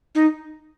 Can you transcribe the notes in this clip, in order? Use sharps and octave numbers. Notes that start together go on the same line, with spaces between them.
D#4